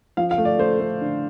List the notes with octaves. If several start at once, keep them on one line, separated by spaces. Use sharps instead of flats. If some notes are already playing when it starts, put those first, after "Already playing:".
F3 F5
F5
A3
D5
A3 C5
A3
D3